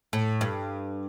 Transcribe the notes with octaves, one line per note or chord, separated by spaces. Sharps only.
A2
G2